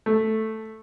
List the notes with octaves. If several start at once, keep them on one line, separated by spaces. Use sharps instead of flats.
A3